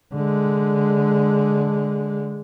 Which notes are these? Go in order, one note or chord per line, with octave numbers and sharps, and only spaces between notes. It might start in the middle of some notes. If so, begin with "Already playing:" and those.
D3 G#3